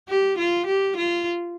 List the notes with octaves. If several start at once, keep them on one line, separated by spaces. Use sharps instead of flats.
G4
F4
G4
F4